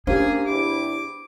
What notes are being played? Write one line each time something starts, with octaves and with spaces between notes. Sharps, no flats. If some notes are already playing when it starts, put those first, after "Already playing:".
A#3 C#4 D4 G4 G#4 C5
E2 C3 E4 D6